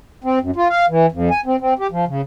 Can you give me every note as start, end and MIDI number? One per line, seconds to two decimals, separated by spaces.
0.24 0.39 60
0.41 0.51 42
0.56 0.68 65
0.70 0.86 77
0.89 1.06 52
1.12 1.29 41
1.31 1.41 80
1.46 1.56 60
1.61 1.74 60
1.79 1.87 67
1.91 2.05 53
2.08 2.21 49